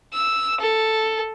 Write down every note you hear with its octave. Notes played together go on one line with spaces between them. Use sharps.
E6
A4